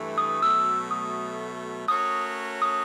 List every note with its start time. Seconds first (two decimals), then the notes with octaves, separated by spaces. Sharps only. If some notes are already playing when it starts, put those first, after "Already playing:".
Already playing: G2 E3 A3
0.18 D#6
0.42 B2 F#3 A3 E6
0.91 D#6
1.88 A3 C#4 F#4 A#4 C#5 D#6
2.62 D#6